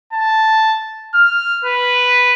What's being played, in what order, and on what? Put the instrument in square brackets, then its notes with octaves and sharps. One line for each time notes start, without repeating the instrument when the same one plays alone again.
[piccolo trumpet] A5
F6
B4